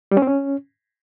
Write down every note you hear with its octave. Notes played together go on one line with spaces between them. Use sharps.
G3
C#4
C4
C#4